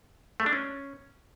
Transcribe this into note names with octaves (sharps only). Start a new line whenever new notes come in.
A3
D4
C#4